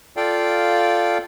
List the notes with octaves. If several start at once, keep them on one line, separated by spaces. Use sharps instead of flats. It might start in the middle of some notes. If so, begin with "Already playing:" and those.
F4 A4 D5 F5 G5